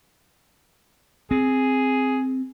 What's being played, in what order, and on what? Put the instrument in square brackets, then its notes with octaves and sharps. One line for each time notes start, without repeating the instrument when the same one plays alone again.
[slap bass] C4 [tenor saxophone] G#4